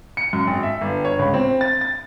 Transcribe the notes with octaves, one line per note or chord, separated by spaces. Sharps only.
C#7
F#2
G#1
E5
G1
C#5
C#2
C4
A6
A6